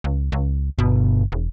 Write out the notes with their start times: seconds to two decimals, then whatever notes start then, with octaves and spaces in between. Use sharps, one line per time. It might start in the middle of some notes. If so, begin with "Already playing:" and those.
0.04 C#2
0.32 C#2
0.79 G1 B2
1.32 E1